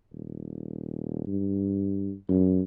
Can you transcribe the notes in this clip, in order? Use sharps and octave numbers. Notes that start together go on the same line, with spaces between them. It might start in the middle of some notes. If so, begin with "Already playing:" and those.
D#1
G2
F#2